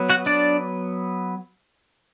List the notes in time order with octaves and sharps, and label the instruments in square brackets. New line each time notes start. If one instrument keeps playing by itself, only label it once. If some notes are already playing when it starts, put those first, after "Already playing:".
Already playing: [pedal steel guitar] F#3 B3
F#4 F#5
D4 D5